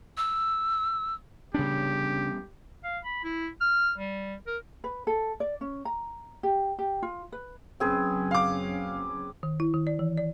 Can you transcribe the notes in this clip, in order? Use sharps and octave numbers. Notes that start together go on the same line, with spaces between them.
E6
C#3 G3 B3 C#4 D4 G4
F5
B5
E4
F6
G3
A#4
B4
A4
D5
C#4
A#5
G4
G4
F4
B4
F#1 F#3 C4 C#4 G#4 B4
F5 D6
D#3
E4
D#3
D5
E3
D5